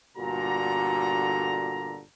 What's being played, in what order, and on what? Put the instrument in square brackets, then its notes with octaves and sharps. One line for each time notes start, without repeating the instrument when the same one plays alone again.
[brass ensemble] G1 A#2 D3 F#4 A#5